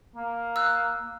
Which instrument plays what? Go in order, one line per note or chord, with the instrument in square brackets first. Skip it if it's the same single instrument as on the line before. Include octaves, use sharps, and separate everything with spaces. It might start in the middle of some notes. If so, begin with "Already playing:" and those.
[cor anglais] A#3
[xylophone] E6 F#6